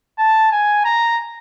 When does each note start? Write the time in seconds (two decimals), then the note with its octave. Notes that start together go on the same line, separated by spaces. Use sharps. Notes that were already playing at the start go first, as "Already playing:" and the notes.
0.19 A5
0.52 G#5
0.85 A#5